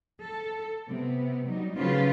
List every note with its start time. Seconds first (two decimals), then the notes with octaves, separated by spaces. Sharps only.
0.21 A4
0.89 C3 B3
1.46 F#3 G3 D#4
1.75 C#3 F#3 A3 F4 B4